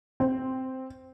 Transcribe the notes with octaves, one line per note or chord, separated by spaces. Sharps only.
C4